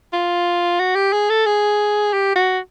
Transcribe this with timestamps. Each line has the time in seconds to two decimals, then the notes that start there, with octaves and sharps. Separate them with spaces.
0.13 F4
0.79 F#4
0.96 G4
1.13 G#4
1.30 A4
1.46 G#4
2.13 G4
2.36 F#4